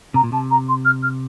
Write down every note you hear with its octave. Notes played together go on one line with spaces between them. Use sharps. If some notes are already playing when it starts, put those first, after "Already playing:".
C3 A#5
A#2
C3 A5
A#5
C6
F6
F6